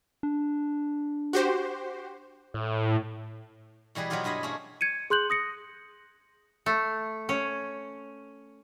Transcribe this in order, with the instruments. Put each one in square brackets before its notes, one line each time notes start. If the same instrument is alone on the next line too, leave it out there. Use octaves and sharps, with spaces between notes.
[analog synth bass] D4
[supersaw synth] F#4 G4 C5
[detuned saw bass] A2
[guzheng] B2 E3 G3 G#4 B4
B2 F#3 B3 E4 F4 G4
G2 E4 G#4 D#5 B5
A3 A#3 C#4 G#4
[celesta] G#6 C#7 D#7
G#4 C6 F#6 G6 F#7
D#6 A#6 C#7
[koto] A3
C#4